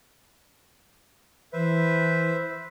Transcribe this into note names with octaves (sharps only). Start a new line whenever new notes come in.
E3 B4 C5 E5